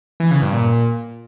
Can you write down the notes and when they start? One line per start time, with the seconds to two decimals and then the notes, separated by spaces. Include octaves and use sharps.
0.20 E3
0.31 C#3
0.42 G2
0.53 A#2